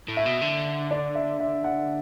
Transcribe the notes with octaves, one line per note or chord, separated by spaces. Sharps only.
A2
E5
B2
D3
D5
E5
E5
F#5